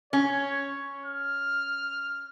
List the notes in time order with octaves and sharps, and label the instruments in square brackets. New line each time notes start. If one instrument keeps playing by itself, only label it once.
[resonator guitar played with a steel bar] C#4 [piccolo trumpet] C#5
[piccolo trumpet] F6